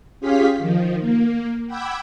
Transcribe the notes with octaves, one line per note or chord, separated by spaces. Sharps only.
C#4 F4 G4 G#4 F5 B6
D#3 F3
A#3
F#5 G5 B5 D6 E6 G#6